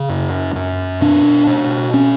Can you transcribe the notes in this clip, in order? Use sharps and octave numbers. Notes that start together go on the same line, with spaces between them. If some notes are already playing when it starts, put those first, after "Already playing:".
Already playing: C#3
F#2
F#2
B2 D4
B2
C#4